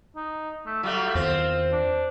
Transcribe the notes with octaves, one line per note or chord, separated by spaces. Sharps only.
D#4
A3
F#3 G3 A3 F4
E2 D#3 C4
D4